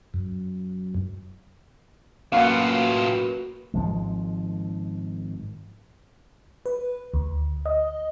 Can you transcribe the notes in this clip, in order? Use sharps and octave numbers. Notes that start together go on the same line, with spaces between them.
F#2
F#2 A2 A#3 F4 B4 F5 F#5
G#1 F3 G#3
B4
D2
D#5